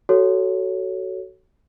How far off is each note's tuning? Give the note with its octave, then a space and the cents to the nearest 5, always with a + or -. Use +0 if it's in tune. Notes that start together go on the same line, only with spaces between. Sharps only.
F#4 +25 A4 +0 C#5 +0